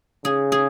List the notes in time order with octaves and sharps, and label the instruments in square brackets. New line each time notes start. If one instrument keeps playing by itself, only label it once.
[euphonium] C#3 [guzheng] G#4
[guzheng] G#4